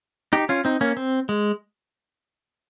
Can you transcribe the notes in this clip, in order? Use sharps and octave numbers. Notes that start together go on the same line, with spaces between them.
D#4 G4
C#4 F4
C4 D#4
A#3 C#4
C4
G#3